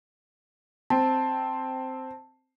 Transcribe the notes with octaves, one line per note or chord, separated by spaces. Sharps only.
C4 A5